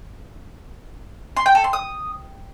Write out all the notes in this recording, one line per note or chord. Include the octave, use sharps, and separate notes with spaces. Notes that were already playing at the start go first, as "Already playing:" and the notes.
C6
G5
A4
C6
D#6